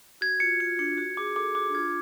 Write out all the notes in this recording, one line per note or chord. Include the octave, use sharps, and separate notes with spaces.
F#4 G#6
F4 C#7
F4 C#7
D4 C#7
F#4 C#7
G#4 D6
A4 D6
F#4 D6
D4
F4 G#6